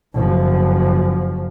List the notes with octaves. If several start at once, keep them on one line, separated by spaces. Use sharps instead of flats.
F#1 F3